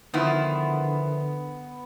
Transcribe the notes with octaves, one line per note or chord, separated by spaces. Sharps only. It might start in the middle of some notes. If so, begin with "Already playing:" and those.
D3 D#3 F3 B3 E4